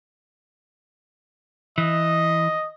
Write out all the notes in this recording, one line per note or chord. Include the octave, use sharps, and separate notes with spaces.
E3 D#5